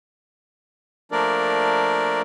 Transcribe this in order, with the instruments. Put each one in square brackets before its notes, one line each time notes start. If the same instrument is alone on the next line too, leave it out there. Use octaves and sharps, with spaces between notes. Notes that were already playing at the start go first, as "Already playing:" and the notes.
[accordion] F3 A3 A#3 D4 A#4 D5